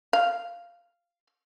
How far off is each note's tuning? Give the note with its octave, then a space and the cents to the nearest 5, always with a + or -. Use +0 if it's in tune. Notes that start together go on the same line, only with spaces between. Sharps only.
F5 -5